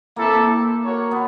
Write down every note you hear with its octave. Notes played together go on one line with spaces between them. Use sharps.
A#3 C4 E4 A4
F#4 A#4 C#5
B3